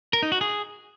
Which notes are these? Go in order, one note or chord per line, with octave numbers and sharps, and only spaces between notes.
A#4
D#4
F#4
G#4